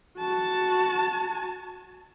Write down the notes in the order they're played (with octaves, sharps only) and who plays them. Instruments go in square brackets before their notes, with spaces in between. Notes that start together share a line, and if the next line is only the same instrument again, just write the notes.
[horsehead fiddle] F#4 A5